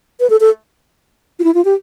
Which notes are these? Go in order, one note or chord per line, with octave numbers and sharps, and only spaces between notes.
B4
A4
A4
F4
E4
F4
G4